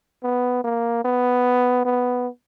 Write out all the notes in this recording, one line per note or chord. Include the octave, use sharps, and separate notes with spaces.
B3
A#3
B3
B3